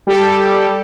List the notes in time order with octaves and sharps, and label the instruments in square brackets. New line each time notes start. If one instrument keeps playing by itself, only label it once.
[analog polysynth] G3 G4 A4